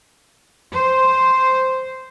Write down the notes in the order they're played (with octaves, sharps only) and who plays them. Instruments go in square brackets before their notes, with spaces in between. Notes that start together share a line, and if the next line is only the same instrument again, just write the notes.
[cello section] C5